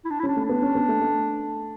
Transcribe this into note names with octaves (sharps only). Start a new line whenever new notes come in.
E4
D4
E4
C#4 D4
A3
B3 D4
C#4
B3
A3
A3